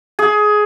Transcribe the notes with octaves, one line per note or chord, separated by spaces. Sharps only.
G#4